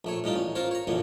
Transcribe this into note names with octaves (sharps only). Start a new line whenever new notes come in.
A#1 A3 C#5
A2 G3 D#4 F4
A1 C#4
F4 A#4 C5 C#5
C#5 A#5
A#1 F#2 A#2 D3 E3